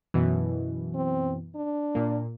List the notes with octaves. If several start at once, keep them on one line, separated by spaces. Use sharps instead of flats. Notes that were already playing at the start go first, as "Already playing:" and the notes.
F#2 B2 E3
C4
D4
A#2 A#3